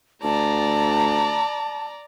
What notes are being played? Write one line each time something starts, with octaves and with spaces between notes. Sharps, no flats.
D2 D5 A5 A#5